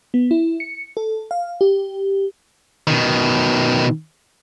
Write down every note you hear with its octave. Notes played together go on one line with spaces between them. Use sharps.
B3
E4
C#7
A4
F5
G4
B2 D#3